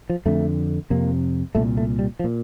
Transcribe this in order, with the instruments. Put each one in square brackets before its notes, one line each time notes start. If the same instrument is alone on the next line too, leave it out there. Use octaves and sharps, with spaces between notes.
[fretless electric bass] F3
F2 D3 A3
F2 C3 A#3
C2 A#2 A3
A3
G3
F3
A#2